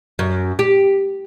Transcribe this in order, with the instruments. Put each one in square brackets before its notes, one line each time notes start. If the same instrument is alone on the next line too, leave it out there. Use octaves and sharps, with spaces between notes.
[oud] F#2
G4